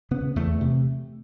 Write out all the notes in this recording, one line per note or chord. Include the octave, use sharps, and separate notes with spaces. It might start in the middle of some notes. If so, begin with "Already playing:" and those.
C#3 B3
E2 A3
C3